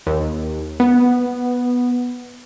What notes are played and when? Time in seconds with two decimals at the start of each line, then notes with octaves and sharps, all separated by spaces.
0.07 D#2
0.80 B3